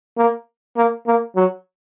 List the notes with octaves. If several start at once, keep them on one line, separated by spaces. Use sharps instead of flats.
A#3
A#3
A#3
F#3